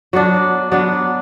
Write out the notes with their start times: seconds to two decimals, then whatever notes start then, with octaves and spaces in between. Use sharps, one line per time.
0.13 F#3 B3 D4
0.72 F#3 B3 D4